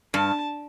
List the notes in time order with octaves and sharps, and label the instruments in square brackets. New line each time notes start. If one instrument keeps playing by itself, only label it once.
[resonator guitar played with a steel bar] G2 [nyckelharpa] A5